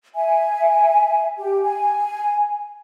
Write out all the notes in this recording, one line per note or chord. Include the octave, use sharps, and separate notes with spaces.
E5 G#5
G4
G#5